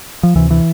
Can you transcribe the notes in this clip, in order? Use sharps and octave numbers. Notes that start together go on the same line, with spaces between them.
F3
D2 C3 E3
E3